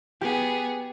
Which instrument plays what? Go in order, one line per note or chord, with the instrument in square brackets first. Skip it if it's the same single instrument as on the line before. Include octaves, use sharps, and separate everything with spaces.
[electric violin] B3 G#4 [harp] G4